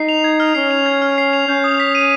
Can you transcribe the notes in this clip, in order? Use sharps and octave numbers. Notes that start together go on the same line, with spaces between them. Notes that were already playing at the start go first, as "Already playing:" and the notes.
Already playing: D#4 C7
F7
G#6
F6
C#4 C7
F7
G#6
F6
C7
F7
C#4 G6
D#6
B6
D#7